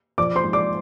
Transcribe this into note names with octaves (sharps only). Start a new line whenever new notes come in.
F3 D5 D6
C5 C6
G#2
D5 D6